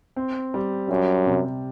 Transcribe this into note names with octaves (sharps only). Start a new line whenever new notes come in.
C4
G3
F#2 G3
C3